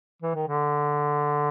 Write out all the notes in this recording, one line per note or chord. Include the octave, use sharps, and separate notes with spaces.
E3
D#3
D3